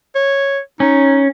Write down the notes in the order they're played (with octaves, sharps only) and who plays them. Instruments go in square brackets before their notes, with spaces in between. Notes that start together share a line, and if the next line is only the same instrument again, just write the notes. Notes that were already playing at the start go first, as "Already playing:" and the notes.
[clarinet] C#5
[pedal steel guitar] C#4 [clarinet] D#4